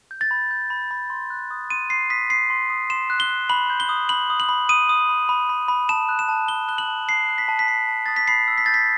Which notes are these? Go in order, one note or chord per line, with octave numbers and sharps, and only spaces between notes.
G6
A6
B5
G6
B5
B5
C6
F#6
D#6
C6 D#7
C6 C7
D#6 B6
C6 C7
C6
D#6
C6 E7
F#6
G7
F#6
B5 F#7
G6
G7
D#6
B5 F#7
D#6
F#7
B5
D#6 D#7
D#6
B5
B5
B5
B5
A5 E7
F#6
E7
A5
A5 G7
F#6 G7
F#7
A5
A5 C7
F#6
B6
A5
B6
A5 C7
A5
D#6 A6
B6
B5 C7
E6
B6
G6 A6
B6